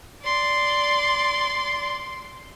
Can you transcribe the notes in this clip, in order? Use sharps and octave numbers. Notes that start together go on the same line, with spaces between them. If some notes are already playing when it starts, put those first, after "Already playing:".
D5 C6